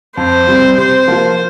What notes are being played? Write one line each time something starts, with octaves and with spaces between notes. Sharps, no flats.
F2 C5
C3 G3 C4
C3 C5
F3 A#3 F4